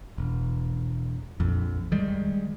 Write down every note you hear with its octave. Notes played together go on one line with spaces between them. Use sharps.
E1
A#1 F2
D#3 G3 G#3